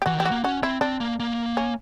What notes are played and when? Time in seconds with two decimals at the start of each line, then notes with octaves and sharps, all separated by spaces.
0.02 G4
0.06 E3 F#4
0.14 D#3
0.19 E3 G4
0.25 F#4
0.31 A#3
0.44 C#4 F#4
0.63 C4 E4
0.81 C4 D4
1.00 A#3
1.20 A#3
1.57 C#4